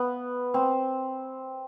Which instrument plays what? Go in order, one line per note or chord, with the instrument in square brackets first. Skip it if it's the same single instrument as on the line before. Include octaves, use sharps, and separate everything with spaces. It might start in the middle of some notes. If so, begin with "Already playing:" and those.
Already playing: [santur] B3
C4